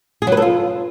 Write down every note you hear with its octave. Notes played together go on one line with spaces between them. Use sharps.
G#4
F#3
B4
A4
F4